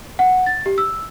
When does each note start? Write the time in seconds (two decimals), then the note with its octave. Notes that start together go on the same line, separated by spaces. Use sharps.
0.19 F#5
0.46 A6
0.66 G4
0.78 E6